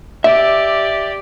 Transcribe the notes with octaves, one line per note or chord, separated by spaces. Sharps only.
G4 D5 E5